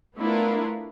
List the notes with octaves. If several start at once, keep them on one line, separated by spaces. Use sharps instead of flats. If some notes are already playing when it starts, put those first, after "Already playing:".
A3 B3 D4 E4 F4 A#4